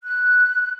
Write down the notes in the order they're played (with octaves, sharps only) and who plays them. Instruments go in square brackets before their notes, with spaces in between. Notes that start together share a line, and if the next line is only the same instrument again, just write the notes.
[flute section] F#6